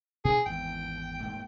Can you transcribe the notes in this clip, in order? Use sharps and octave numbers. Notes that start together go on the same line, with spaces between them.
B2 D4 G#4
G#1 E2 E3 G5
D#1 G#2 A3